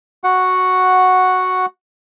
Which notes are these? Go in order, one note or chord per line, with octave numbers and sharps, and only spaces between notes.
F#4 F#5